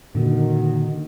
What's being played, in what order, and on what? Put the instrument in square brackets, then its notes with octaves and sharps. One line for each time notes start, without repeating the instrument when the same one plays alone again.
[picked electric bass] A#2 D3 [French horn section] D#3 F#4